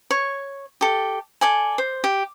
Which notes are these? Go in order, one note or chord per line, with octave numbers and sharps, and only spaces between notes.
C#5 C#6
G4 A4
A4 D5 G#5
C5
G4